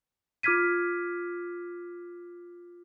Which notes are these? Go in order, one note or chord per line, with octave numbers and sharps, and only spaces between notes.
F4 D6 F6 G#6 B6 D#7